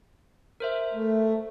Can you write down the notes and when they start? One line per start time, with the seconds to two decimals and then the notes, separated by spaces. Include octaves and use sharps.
0.60 A#4 C5 E5
0.94 A3